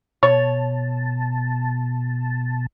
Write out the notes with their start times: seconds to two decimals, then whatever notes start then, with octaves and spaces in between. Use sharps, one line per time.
0.23 B2 C#5 A5